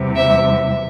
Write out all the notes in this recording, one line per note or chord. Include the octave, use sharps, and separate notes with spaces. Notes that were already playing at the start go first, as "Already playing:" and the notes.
Already playing: E2 C3 G3
E5